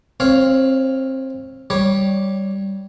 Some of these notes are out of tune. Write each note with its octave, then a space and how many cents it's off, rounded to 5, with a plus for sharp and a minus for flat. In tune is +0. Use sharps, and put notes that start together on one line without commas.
C4 +20 C#5 +0 F5 +0
G3 -10 C#5 +0